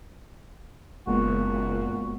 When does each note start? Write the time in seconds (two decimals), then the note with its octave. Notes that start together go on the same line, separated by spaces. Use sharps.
1.07 F#1 A#2 G#3 A#3 B3 F#4